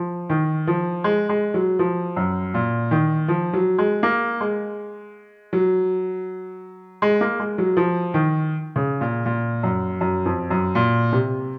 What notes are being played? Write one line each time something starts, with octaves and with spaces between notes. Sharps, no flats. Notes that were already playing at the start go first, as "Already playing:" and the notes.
Already playing: F3
D#3
F3
G#3
G#3
F#3
F3
F#2
A#2
D#3
F3
F#3
G#3
A#3
G#3
F#3
G#3
A#3
G#3
F#3
F3
D#3
C#3
A#2
A#2
F#2
F#2
F2
F#2
A#2
C3